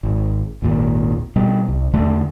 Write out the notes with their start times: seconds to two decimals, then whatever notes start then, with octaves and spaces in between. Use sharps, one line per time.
0.03 G#1
0.62 G#1 D#2 A#2
1.36 B2 G3
1.68 C2
1.93 E2 D3 A3